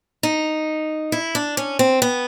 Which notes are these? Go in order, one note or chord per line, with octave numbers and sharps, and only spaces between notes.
D#4
E4
D4
C#4
C4
B3